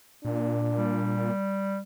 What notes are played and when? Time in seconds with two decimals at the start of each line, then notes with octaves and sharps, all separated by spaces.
0.25 A#2 D4
0.78 G3